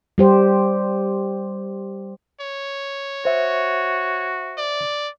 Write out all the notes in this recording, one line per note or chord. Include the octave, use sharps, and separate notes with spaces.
G3 G4 C5
C#5
F#4 C5 E5
D5